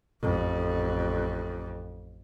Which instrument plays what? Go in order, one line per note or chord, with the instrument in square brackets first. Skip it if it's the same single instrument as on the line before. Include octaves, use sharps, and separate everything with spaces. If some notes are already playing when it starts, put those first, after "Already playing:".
[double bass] A1 F2